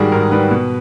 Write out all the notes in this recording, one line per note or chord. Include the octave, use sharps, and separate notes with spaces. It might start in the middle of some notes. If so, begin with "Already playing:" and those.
Already playing: G#2 D#3 G3 F#4 G#4
G#2 A#4
D#3 G3 B4
B2